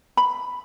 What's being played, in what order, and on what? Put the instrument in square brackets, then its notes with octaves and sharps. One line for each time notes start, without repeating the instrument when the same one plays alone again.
[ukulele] B5